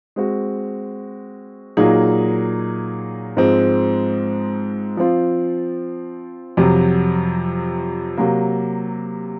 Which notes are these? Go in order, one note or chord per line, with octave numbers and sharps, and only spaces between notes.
G#3 C4 F#4
A#2 F#3 A#3 D#4 G#4
G#2 F3 G#3 C4
F3 C4 F4
F2 C3 F#3
C3 F#3 A#3